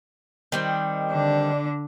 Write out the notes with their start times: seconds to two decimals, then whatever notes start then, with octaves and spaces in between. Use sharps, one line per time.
0.52 D#3 G3 C4
1.11 D3 D4